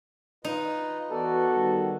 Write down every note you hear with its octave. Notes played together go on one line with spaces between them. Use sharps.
D#4 F4 B4 D#5
E3 B3 F#4 A4 D5
D#3 G3